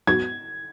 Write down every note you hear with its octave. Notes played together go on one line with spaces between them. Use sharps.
G#2 F#3 B3 F#4 G#6